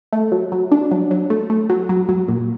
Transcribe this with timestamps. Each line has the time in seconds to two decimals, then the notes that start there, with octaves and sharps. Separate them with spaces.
0.13 A3
0.32 F#3
0.52 F#3
0.72 D4
0.91 F#3
1.11 F#3
1.30 A3
1.50 A3
1.70 F#3
1.89 F#3
2.09 F#3
2.28 A#2